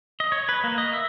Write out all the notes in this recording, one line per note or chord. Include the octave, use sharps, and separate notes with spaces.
D#5
C#5
B4
A#3
D#5
E5